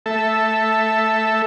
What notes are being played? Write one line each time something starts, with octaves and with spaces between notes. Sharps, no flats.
A3 A4 E5